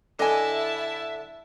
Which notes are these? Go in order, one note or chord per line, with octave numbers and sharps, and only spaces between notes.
D3 E4 D#5 E5 G#5 A5